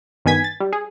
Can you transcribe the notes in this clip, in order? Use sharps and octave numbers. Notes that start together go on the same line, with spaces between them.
G2 D#3 B3 G#5 G#6 B6
A6
G3
G#4